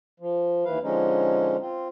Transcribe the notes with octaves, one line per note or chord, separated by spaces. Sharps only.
F3
D#2 E3 B4 F5
D3 F3 G#3 C#4 D#4
C4 F4